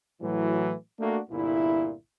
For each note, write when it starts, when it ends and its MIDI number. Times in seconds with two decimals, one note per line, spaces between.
0.21 0.73 45
0.21 0.73 52
0.21 0.73 54
0.99 1.19 57
0.99 1.19 58
0.99 1.19 62
0.99 1.19 66
1.30 1.93 31
1.30 1.93 36
1.30 1.93 46
1.30 1.93 64